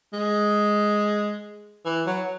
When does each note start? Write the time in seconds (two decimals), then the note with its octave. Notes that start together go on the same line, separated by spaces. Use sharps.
0.13 G#3
1.85 E3
2.06 F#3